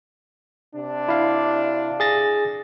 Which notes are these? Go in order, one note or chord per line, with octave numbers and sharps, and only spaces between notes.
C3 D4
E4 F5
G#4 A6 A#6